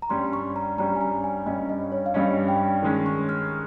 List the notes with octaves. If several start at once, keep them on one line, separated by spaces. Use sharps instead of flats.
A#5
G2 G3 C#4 C6
C#6
A#5
G2 G3 C#4 A#5
G#5
A#5
G#5
G2 G3 C#4 D#5
D#5
C#5
F5
G2 G3 C#4 D#5
G5
D#3 G#3 C#4
C#6
F6